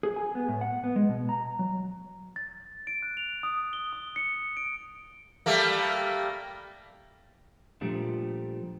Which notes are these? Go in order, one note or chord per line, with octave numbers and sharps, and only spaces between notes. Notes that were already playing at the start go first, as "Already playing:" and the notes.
G#4
G#5
B3
A2
F#5
B3
G#3
B2
A#5
F#3
A6
D7
F#6
F7
D#6
G7
D#6
C#7
D7
G3 A3 A#3
A#2 F3 G3 A3 D4